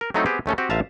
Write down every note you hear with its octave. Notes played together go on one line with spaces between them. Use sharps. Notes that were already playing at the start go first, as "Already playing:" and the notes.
A#4
F#3 A3 C4 D#4 E4 A4
B3 C4 G4 G#4
D#2 A3 C#4 A4
C4 F#4 G4
A1 F4 E5 F5 A5 A#5